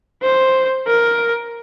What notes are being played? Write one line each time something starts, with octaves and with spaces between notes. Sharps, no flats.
C5
A#4